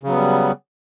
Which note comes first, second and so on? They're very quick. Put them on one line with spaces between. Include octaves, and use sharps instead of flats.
C#3 F#3 B3 G3